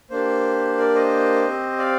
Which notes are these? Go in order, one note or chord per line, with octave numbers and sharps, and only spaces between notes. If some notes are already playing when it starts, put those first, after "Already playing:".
A#3 D4 G4 C5
A#4 D5
C5 D#5
C4 G4
D5 F5